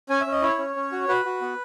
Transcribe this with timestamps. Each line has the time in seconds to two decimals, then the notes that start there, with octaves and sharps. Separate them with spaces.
0.10 C#4 G#5
0.21 E5
0.27 C#4
0.32 D#5
0.42 E4 C#5
0.59 C#4
0.76 C#4
0.92 F#4
1.08 F#4 B4
1.25 F#4
1.41 B3